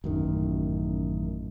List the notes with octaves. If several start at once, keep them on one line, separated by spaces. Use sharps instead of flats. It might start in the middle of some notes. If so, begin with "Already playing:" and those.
A1 F#2 D#3